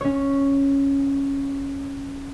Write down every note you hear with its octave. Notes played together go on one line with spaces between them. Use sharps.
C#4 C#5